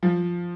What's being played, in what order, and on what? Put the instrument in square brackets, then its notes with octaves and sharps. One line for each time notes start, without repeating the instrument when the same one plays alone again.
[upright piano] F3